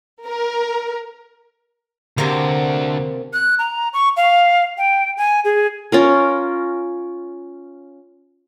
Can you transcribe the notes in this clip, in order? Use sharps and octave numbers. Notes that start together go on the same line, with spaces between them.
A#4
D2 C3 A#3
F#6
A#5
C#6
F5
G5
G#5
G#4
C#4 F4 A#4